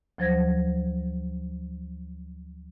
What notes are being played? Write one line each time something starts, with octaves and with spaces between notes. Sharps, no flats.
D2 F3 F#3 C5 G#6 A#6